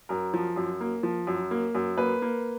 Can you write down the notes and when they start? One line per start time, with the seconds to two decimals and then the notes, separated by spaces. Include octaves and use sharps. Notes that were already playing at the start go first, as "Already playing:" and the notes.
0.09 F#2 A#4
0.34 F3
0.56 F#2
0.81 A#3
1.03 F3
1.27 F#2
1.51 A#3
1.75 F#2
1.97 A#3 B4
2.22 A#3